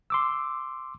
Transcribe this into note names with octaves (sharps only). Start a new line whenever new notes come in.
C6 D6 E6